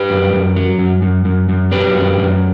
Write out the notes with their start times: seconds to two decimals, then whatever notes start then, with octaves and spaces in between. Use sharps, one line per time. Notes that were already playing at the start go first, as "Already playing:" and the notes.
Already playing: G4 B4
0.10 F#2
0.33 F#2
0.56 F#3
0.79 F#2
1.02 F#2
1.25 F#2
1.49 F#2
1.71 F#3 G4 B4
1.95 F#2
2.18 F#2